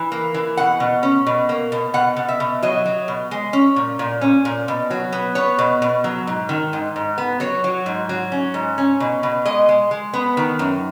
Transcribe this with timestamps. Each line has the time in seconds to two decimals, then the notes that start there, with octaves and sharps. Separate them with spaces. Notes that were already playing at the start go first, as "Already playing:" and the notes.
Already playing: E3
0.12 A#3
0.34 E3
0.57 B2 F#5
0.80 B2
1.03 C#4
1.27 B2
1.49 A#3
1.72 B2
1.94 B2 F#5
2.17 B2
2.28 E5
2.40 B2
2.63 F#3 D#5
2.86 F#3
3.08 B2
3.31 G#3
3.53 C#4
3.76 A#2
3.99 A#2
4.21 C#4
4.45 A#2
4.68 B2
4.90 F#3
5.12 B3
5.35 B3 C#5
5.59 B2
5.82 B2
6.04 F#3
6.27 G#2
6.49 D#3
6.73 G#2
6.96 G#2
7.18 B3
7.40 F#3 C#5
7.64 F#3
7.86 G#2
8.09 F#3
8.32 C#4
8.54 G#2
8.78 C#4
9.00 B2
9.23 B2
9.45 G#3 D#5
9.69 G#3
9.91 G#3
10.14 B3
10.37 D#3
10.59 F#2